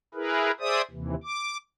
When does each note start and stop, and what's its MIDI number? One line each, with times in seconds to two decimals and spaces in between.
0.14 0.51 64
0.14 0.51 68
0.14 0.51 70
0.14 0.51 71
0.60 0.82 68
0.60 0.82 72
0.60 0.82 74
0.60 0.82 76
0.60 0.82 87
0.91 1.15 39
0.91 1.15 48
0.91 1.15 52
1.24 1.57 86